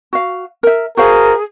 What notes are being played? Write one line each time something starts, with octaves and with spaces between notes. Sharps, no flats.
F#4 F5
A#4 E5
F#4 G#4 A#4 C5 F5